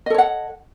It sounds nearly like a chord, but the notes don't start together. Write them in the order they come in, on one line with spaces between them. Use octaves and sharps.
D#5 A4 C#5 F#5